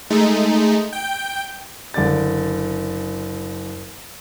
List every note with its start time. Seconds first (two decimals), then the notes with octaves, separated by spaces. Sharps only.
0.10 G#3 A3 D#4
0.93 G5
1.94 F#1 D3 D5 A6